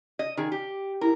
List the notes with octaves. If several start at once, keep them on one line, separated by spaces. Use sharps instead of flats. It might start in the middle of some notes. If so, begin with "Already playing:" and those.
D#5
D#3 G#4
G4
E4 A#4